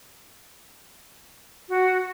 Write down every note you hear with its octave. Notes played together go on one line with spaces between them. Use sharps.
F#4